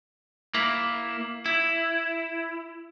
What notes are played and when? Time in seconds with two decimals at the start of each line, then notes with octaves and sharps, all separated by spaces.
0.54 A#3 E4
1.46 E4